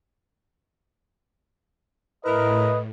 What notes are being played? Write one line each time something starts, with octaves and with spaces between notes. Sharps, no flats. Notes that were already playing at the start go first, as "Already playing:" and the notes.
A2 E4 A#4 B4 D#5